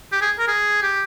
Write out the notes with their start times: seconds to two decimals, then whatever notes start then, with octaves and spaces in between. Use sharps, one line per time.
0.12 G4
0.21 G#4
0.39 A#4
0.48 G#4
0.83 G4